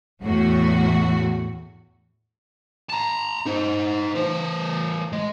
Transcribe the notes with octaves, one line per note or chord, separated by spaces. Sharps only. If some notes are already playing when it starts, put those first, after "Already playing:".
E2 A2 F#4
A5 A#5
D#4 C5
E3 C5
G#3 D#5